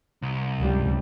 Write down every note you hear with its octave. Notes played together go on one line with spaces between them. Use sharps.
C2
C#2 G2 G3